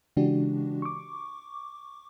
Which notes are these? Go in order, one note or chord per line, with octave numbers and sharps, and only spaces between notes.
C#3 E3 G#3 D4 F#4 G4
C#6 D6